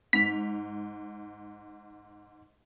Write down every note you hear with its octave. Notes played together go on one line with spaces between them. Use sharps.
G#2 B6 F7